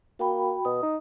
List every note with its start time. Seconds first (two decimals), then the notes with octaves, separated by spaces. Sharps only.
0.19 A#3 F#4 G5 B5
0.65 B2 D#6
0.82 D#4